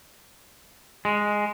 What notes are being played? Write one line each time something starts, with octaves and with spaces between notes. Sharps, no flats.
G#3